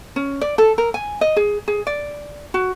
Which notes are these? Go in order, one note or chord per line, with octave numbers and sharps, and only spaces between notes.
C#4
D5
A4
A#4
G#5
D#5
G#4
G#4
D5
F#4